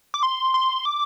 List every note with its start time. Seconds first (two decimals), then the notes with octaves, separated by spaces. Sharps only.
0.14 D6
0.23 C6
0.54 C6
0.85 D6